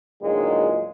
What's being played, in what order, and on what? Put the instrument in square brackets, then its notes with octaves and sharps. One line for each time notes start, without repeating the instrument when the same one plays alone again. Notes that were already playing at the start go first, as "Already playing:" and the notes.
[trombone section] A#1 E2 A#2 D#3 F#3 G#3